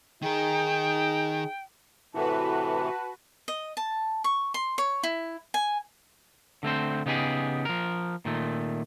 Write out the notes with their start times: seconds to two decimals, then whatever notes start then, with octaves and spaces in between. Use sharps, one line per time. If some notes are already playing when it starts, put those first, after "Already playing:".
0.22 D#3 D#4 G#4 A#4 G5
2.14 A2 C3 E3 E4 F#4 A4 B4 A5
3.48 D#5
3.77 A5
4.24 C#6
4.54 C6
4.78 C#5
5.03 E4
5.54 G#5
6.63 D3 A3 C4 C5
7.06 C#3 B3 D#4 G4 G#4
7.65 F3 A#4
8.25 A#2 D#3 A3